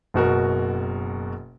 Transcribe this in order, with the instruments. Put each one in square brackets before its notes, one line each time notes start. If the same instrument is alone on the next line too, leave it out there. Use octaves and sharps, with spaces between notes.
[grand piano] F#1 B2 F#4 A#4